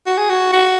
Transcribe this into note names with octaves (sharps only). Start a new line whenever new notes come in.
F#4
G#4
F#4
F#4